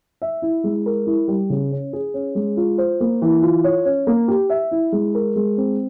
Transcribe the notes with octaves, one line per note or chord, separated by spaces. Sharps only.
E5
E4
G#3
A#4
E4
G3
C#3
C#4
G#4
C#4
G#3
F4
C5
A#3
E3
F4
C#5
C#4
A#3
G4
E5
E4
G#3
A#4
G#3
C4